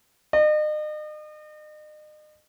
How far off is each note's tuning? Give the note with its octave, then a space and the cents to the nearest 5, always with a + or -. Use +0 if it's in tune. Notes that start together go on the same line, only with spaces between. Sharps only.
D#5 -40